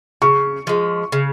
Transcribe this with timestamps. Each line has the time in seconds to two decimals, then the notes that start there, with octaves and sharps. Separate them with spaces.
0.22 C#3 C#6
0.67 F3 G#3
1.12 C#3